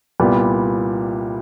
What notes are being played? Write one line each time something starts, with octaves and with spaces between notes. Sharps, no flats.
C2 A#2 G3 B3